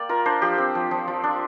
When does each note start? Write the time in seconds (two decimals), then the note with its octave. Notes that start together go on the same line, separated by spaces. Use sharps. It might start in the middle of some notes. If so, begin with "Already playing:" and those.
Already playing: A#3 D5 G5
0.09 F4 A#4
0.26 D4 C5
0.42 F3 G4
0.58 C4
0.75 F3
0.91 F3
1.08 F3
1.24 D4